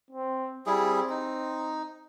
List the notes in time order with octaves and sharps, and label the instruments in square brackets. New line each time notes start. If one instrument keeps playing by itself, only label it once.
[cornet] C4
[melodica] G3 E4 G#4 [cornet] C4
[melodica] D#4